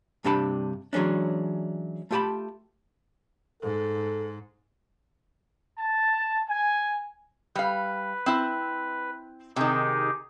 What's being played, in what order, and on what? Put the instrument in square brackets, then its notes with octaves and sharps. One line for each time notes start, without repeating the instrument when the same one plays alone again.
[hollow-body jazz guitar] G2 C3 D4 G4 A5 B5
E3 F#3 G#3 C#4 D4
A3 F4 G4 F#5 A5 B5
[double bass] G#2 [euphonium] A4
[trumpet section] A5
G#5
[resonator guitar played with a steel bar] G3 F5 [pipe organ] B4
[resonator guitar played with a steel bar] C4 E4
[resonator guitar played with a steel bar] C3 D#3 [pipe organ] D#4 G4 G#4